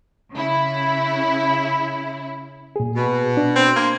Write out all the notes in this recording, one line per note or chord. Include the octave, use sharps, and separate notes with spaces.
C#3 E4
A#2 G#4
B2
D4
C4
A#3 C6 G#6